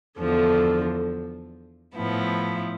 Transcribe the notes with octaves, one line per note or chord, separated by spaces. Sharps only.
E2 D3 F3
A2 F3 B3 E4